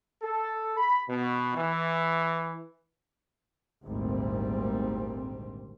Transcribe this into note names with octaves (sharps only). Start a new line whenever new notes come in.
A4
B5
B2
E3
G#1 D2 A#2 G3 C4